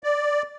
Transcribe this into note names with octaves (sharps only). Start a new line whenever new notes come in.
D5